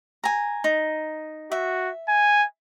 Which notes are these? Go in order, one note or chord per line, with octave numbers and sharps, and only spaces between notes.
G#5 A#5
D#4
F#4 E5
G#5